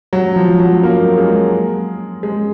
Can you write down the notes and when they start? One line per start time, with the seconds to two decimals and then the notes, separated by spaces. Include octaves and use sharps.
0.13 F#3
0.36 F3
0.60 F#3
0.83 A#3
1.18 G#3
2.23 G#3